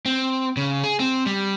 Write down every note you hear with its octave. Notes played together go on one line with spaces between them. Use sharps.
C4
C#3
G#4
C4
G3